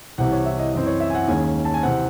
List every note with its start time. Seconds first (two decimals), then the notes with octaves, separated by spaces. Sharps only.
0.18 C2 C3 E3 F#5
0.32 C#5
0.46 E5
0.59 D#5
0.73 F#2 E3 C4 D#5
0.83 C5
0.87 C#5
1.00 E5
1.10 G#5
1.15 F#5
1.28 D#2 D#3 G#3 C#4 G#5
1.65 A5
1.74 G#5
1.83 C3 E3 C4 F#5